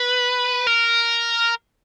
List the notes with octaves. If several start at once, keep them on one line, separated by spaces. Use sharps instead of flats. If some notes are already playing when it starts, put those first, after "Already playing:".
Already playing: B4
A#4